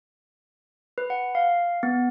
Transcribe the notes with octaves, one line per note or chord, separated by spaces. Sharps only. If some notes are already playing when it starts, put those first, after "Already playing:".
B4
F#5
F5
B3